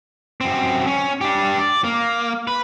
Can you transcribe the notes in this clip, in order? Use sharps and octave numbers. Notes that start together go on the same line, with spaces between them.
F#2 C4
C#4
D4 G4
D5
A#3
B4